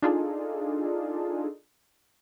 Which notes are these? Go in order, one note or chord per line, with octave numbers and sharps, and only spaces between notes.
D4 D#4 F4 G#4 A4